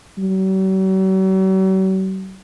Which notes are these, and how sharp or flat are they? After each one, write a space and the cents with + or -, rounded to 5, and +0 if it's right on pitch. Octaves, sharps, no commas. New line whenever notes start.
F#3 +45